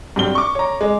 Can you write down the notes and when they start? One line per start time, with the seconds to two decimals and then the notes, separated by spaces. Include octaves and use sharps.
0.16 G2 F#3 C4 G4 G7
0.35 C#6 D6
0.55 C#5 A#5
0.81 G#3